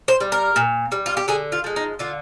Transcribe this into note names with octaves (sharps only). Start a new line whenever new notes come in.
C5
G3
A#4
A#2
G3
F4
G4
D3 G#4
F4
F3 G#3
D#4
D3 F4